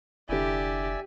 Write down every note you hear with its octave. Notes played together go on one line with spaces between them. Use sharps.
F1 D3 E4 G4 D5 E5 G#5